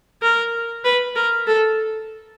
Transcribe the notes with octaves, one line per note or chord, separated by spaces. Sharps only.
A#4
B4
A#4
A4